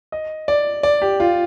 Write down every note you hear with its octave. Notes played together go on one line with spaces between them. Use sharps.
D#5
D5
D5
G4
F4